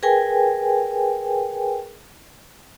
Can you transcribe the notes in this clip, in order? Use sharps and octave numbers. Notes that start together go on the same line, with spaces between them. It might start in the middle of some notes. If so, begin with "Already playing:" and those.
G#4 A#4 B4 G5 G#5